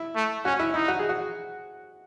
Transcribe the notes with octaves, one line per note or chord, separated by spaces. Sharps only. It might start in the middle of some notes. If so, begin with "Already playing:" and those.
Already playing: E4
A3
C#4 F#4
E4
D#4 E4
F#4
G#4
F#4